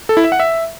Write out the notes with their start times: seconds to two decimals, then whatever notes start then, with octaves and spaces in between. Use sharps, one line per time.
0.09 A4
0.17 E4
0.24 E5
0.32 F#5
0.40 E5